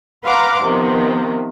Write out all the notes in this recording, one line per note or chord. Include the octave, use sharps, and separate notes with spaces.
B4 F5 F#5 A#5 C6 D6
C3 D#3 F3 B3